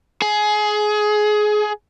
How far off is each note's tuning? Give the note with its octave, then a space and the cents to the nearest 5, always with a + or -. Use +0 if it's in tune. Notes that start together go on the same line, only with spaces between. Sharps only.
G#4 +20